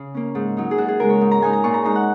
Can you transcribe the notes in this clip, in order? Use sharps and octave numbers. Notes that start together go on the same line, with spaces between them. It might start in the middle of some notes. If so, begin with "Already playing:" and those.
Already playing: C#3
A#3 C#4
G#2
F#3 D#4
G#4
F#2 F#4
G#4
C#3 G#3 A#4
C#5
G#2
A#5
G#3 D#4 G#5
A#5
A#2 C#6
A#5
G#3 D#4 A#5
F#5